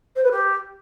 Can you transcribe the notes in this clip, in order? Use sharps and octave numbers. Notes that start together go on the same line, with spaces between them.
C5
B4
G4